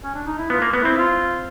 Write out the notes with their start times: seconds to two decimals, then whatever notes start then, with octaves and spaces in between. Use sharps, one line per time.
0.03 C#4
0.15 D4
0.26 D#4
0.38 E4
0.50 B3 F4
0.62 A#3
0.74 B3
0.81 C4 E4
0.97 F4